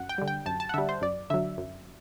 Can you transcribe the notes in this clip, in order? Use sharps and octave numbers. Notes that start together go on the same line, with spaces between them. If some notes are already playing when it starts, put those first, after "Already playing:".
Already playing: F#2 F#5
G5
D3 G3
G5
F#2 A5
A5
F#5
D3 G3 E5
C5
F#2 D5
D3 F#3 E5
F#2